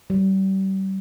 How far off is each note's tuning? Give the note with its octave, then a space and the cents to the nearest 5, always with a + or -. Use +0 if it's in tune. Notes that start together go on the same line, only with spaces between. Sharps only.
G3 -35